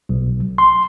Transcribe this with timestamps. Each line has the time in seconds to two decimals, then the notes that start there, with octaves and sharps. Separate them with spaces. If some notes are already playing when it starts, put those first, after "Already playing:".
0.09 B1
0.58 C6